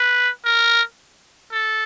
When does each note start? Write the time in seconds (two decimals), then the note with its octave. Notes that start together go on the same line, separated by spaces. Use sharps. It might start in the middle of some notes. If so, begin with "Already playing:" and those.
Already playing: B4
0.45 A#4
1.52 A4